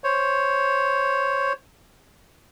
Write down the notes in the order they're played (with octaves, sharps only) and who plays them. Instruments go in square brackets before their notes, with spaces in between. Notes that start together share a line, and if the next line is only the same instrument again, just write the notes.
[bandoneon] C5 C#5